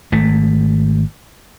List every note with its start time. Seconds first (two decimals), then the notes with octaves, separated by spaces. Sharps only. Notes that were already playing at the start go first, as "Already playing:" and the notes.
0.12 G#1 A3